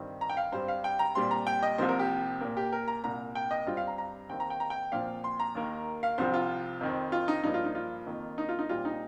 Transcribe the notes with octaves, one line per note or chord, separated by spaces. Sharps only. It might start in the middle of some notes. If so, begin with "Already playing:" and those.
Already playing: G2 D#3 C4
A#5
G5
F5
G2 G3 C4 C5
F5
G5
A#5
A#2 G3 C4 C6
A#5
G5
D#5
C2 C3 F3 A#3 C5
A#4
G4
A#2 A#3
G4
A#4
A#5
C2 A#2 A#3 A#5
G5
D#5
G2 G3 C4 F4
F5
A#5
A#5
D#2 D#3 C4 G5
A#5
G5
A#5
G5
A#2 F3 C4 F5
C6
A#5
D#2 D#3 A#3
F5
C2 C3 F3 C4 C5
F4
F2 D#3 C4
F4
D#4
G2 F3 A#3 D#4
F4
D#4
F4
F2 D#3 A#3
D#4
F4
D#4
A#2 G3 C4 F4
D#4